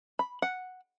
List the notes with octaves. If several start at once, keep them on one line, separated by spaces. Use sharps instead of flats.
B5
F#5